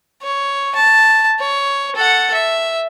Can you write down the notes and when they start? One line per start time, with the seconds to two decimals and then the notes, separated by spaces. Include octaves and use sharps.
0.22 C#5
0.75 A5
1.39 C#5
1.96 A4 F#5
2.34 E5